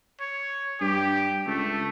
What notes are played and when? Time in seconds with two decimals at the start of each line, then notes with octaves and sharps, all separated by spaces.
0.20 C#5
0.81 G2 G4
1.47 C#2 A3